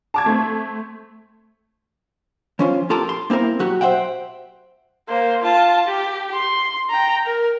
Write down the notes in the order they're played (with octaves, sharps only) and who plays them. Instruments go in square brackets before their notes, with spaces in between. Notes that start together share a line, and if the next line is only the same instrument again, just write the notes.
[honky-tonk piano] A5 D6 G#6
A3 C4
[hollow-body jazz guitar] F3 C#4 F4
F4 G4 A4 A#4
C6
A#3 C4 E4 A#4
F#3 F#4 G4
C5 E5 F#5 G5
[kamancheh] A#3 C5
F4 A5
G4
C6
G5 A#5
A#4